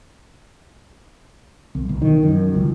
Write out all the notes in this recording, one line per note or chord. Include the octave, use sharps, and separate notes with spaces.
C2
B1
D#3
F#2
C#2